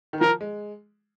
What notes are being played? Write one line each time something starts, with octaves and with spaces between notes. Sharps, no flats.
D#3
F3 A#4
G#3